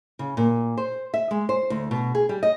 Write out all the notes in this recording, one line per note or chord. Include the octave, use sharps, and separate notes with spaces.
C#3
A#2
C5
E5
G#3
C5
D2
B2
G#4
G3
D#5